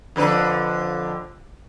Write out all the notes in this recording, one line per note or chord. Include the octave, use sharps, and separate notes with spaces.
F2 D3 B4